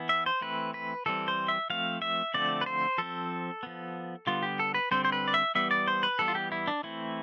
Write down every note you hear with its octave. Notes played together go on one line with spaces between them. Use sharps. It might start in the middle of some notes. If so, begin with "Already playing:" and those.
Already playing: E3 B3
E5
C5
E3 A3 C4 B4
B4
E3 G3 C4 A4
C5
E5
F3 A3 C4 F5
E5
D3 F3 A3 C4 D5
B4
C5
F3 C4 A4
F3 B3
D3 G3 B3 F4
G4
A4
B4
D3 G3 C4 C5
C5
B4
D5
E5
E3 G3 B3 E5
D5
C5
B4
E3 G3 B3 A4
F4
G4
E4
D4
E3 A3 C4 E4